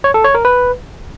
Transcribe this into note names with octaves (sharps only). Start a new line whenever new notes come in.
C#5
A4
C#5
A#4
B4